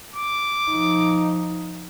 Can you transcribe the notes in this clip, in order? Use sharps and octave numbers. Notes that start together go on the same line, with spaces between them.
D6
F3 D#4